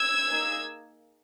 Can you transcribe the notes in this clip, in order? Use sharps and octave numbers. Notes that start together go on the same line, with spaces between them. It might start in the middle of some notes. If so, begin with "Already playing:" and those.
Already playing: E6 G#6
A#3 D#4 G#4